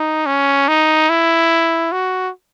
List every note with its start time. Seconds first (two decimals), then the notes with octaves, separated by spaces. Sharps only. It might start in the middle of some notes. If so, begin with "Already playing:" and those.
Already playing: D#4
0.27 C#4
0.68 D#4
1.10 E4
1.92 F#4